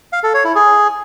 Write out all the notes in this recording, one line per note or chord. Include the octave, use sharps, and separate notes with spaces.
F5
A4
C#5
E4
G#4